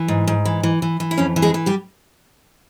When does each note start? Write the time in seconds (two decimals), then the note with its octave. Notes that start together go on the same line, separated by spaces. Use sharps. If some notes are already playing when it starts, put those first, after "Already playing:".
Already playing: E3
0.08 G#2
0.28 G#2
0.45 E3
0.63 E3
0.82 E3
1.00 E3
1.11 E4
1.18 F2 C#3 C#4
1.36 E3
1.42 G#3 G#4
1.54 E3
1.66 G3 G4